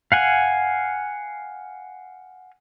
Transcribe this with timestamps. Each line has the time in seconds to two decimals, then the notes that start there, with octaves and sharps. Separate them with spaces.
0.12 F5 F#5 G#5